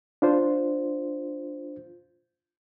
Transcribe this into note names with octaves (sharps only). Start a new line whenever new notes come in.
D4 F4 C5